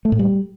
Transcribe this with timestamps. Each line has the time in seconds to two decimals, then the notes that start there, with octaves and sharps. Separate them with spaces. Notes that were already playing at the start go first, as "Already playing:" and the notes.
0.05 A3
0.12 A2
0.19 G3